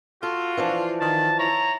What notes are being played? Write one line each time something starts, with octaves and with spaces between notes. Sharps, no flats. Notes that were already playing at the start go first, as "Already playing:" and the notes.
F4 F#4 A4
E3 F3 D4
D#3 A5
E4 C#5 A#5